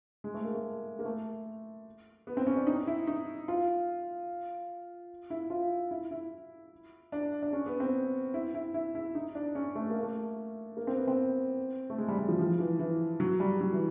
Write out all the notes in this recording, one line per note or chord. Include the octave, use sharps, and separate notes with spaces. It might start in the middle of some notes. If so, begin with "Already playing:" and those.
G#3
A3
A#3
A3
A#3
A3
B3
C4
C#4
D4
D#4
E4
D#4
F4
E4
F4
E4
E4
D4
D4
C#4
B3
C4
E4
E4
E4
E4
D#4
D4
C#4
A3
A#3
A3
A#3
C4
B3
C4
A3
G#3
G3
G3
F3
F3
E3
E3
F#3
G3
F#3
E3